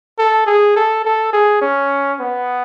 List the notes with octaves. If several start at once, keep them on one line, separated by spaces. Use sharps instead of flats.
A4
G#4
A4
A4
G#4
C#4
B3